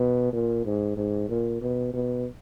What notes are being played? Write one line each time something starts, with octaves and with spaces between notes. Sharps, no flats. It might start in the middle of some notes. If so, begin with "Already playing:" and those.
Already playing: B2
A#2
G#2
G#2
A#2
B2
B2